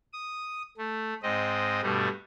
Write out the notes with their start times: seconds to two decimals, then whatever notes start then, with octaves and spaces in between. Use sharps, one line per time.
0.13 D#6
0.78 A3
1.23 G#2 C4 D#5
1.82 G2 B2 G3 A3